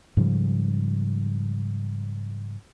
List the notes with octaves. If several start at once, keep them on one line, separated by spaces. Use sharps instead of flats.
G#2 C#3 F3 G3